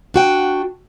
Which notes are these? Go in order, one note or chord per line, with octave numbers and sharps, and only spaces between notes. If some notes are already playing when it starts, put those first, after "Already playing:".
D4 F#4 G5